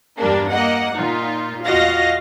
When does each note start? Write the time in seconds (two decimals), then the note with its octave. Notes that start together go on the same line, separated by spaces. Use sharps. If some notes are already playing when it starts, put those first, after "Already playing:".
0.19 E2 G2 G3 A#3 D4
0.50 A#3 D#5 F#5
0.96 A#2 D#4 F4
1.65 E2 F4 F#4 D#5 F5 A#6